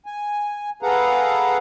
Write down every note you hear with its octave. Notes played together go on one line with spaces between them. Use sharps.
G#5
G#4 A4 B4 F5 F#5 A#5